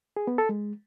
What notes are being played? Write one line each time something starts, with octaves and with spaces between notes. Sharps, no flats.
G#4
B3
A4
G#3